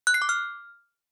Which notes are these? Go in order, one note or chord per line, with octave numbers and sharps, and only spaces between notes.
F#6
C7
D6
F6